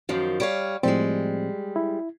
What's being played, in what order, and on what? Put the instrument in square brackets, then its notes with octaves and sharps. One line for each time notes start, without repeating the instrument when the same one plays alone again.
[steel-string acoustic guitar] F#2 D#3 F3
G3 C#5 F5
[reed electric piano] A2 F3 C4 [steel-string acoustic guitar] G3 G#3
[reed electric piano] E4